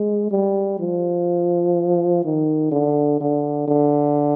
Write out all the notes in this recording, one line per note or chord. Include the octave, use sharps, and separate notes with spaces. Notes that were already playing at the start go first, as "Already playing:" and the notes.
Already playing: G#3
G3
F3
D#3
D3
D3
D3